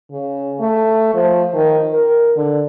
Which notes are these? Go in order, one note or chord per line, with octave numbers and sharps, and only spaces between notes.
C#3
A3
F3
D#3
A#4
D3